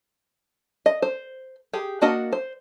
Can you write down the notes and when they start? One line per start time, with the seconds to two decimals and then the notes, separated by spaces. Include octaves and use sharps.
0.86 D#5
1.02 C5
1.73 G4 G#4
2.02 A#3 D4 F#4 D#5 F#5
2.32 C5